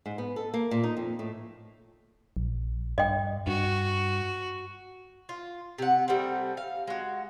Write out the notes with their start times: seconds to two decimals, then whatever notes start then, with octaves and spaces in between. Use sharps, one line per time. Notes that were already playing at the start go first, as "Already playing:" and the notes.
0.06 G#2
0.18 B3
0.36 A4
0.54 A#3
0.71 A#2
0.84 D#4
0.97 F2
1.19 A2
2.37 A#1
2.98 G2 D#5 G5
3.47 G2 F#4
5.29 F4
5.78 C3 F#5
6.08 G3 A3 A#3 C4
6.57 F5
6.87 G#3 F#4